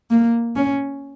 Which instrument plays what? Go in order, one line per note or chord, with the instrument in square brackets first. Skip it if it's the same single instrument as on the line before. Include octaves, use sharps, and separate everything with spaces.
[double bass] A#3
C#4